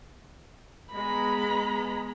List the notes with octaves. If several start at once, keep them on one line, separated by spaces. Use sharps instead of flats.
G#3 B3 A#5 B5